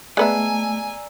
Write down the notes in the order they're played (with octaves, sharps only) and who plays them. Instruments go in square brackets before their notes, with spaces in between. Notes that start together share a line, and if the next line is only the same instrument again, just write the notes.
[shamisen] G#3 B3 E5 [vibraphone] A3 [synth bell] D5 A#5 E6 [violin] G#5